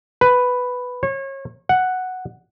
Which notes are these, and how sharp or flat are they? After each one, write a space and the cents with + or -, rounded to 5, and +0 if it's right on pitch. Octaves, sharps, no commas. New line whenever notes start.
B4 +5
C#5 -30
F#5 +0